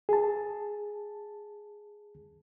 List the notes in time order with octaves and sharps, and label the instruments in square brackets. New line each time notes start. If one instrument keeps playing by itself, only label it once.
[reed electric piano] G#4 A5